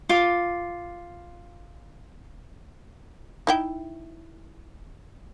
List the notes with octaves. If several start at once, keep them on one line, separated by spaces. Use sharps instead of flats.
F4 D6
D#4 E4 G5